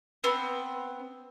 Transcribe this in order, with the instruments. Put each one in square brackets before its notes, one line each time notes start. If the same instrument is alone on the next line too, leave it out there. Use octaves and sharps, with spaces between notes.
[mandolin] B3 C4